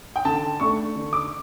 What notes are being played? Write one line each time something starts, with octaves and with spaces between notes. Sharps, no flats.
G5
D3 A5
A3 D4 C#6
D3
D6